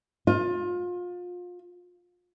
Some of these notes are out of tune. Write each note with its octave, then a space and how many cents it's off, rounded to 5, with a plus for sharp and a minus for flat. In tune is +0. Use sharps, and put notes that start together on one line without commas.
F4 +30